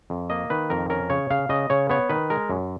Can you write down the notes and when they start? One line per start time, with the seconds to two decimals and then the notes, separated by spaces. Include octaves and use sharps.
0.10 F2
0.30 A#3 D#5
0.50 D#3 B4
0.70 F2 A#4
0.90 C#4 A#4
1.10 C#3 C#5
1.30 C#3 F5
1.49 C#3 D#5
1.70 C#3 C#5
1.89 B3 C#5
2.09 D#3 B4
2.30 G#3 A#4
2.49 F#2